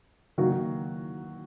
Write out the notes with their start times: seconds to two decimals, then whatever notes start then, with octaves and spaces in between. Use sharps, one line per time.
0.38 D#3 F#3 A#3 F#4